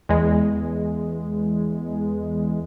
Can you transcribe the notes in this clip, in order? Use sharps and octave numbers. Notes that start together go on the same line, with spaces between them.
E2 G#3